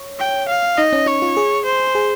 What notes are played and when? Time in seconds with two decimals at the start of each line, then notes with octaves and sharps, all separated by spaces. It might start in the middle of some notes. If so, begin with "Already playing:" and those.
Already playing: C#5
0.19 G5
0.48 F5
0.78 D#4 D#5
0.93 C#4
1.06 D#4 C#5
1.22 F4
1.37 G#4
1.65 C5
1.95 G#4